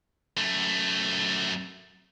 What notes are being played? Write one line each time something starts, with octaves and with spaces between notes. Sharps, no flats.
F#2 A3